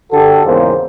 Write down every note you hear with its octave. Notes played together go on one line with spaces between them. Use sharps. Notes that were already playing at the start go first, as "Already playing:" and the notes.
D3 F#4 G4 A4
E2 G#2 C#3 A#3 C5